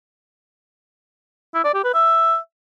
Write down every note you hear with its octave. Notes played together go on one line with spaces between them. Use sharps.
E4
D5
G4
B4
E5